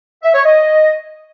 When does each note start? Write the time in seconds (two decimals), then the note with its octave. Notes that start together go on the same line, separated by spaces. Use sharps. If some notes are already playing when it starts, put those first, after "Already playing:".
0.23 E5
0.34 C#5
0.45 D#5